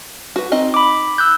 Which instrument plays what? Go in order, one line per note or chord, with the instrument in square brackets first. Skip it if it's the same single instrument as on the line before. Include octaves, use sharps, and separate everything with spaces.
[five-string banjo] F#4 B4
C4 D#4 D#5
[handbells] B5 D6
E6 F#6 G6